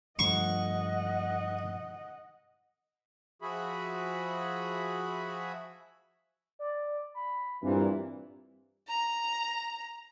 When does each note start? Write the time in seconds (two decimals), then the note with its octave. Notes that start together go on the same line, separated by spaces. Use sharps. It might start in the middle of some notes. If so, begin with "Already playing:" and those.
0.19 G2 F3 A3 D#5 F#5 C#6
3.42 F3 F#4 G#4 E5 B5
6.59 D5
7.14 B5
7.63 G2 A#2 E3 C4
8.88 A#5